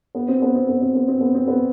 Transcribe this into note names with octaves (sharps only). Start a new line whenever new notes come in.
B3
C4
B3
C4
B3
C4
B3
C4
B3
C4
B3